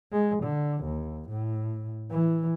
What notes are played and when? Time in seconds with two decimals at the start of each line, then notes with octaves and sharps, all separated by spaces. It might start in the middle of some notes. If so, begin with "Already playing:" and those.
0.12 G#3
0.44 D3
0.84 D#2
1.29 A2
2.11 E3